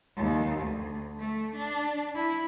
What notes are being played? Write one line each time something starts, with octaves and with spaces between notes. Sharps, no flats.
D#2
D2
A3
D4
E4